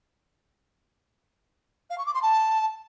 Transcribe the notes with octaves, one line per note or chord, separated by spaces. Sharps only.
F5
C#6
D6
C6
A5